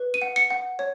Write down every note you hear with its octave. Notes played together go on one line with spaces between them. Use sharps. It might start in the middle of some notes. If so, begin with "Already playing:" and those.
Already playing: B4
D#7
F#5
C#7
F#5
C#5